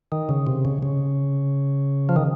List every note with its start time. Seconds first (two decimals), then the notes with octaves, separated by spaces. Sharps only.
0.12 D#3
0.29 C#3
0.47 C3
0.65 C#3
0.83 C#3
2.09 F3
2.16 D#3